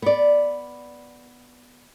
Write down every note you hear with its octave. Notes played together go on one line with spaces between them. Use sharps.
B3 D5